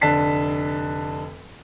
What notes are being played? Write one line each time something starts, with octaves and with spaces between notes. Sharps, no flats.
F1 D3 D4 A5 B6 C7